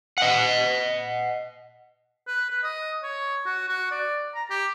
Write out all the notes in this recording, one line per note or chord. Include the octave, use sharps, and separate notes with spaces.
D#5 F#5
B4
B4
D#5
C#5
F#4
F#4
D5
A#5
G4